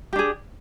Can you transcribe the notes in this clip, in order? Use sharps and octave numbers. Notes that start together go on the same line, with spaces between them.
D4 G4 G#4